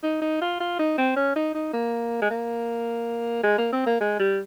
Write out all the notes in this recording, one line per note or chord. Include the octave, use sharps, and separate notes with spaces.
D#4
D#4
F4
F4
D#4
C4
C#4
D#4
D#4
A#3
G#3
A#3
G#3
A#3
C4
A#3
G#3
G3